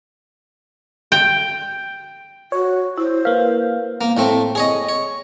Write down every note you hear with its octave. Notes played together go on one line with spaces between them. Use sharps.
G5
F#4 C#5
E4 C5
A#3 B4 F5
A#3
A2 A3 C4
G#4 C#5 D#5
C#5